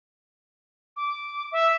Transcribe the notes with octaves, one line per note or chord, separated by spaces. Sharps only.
D6
E5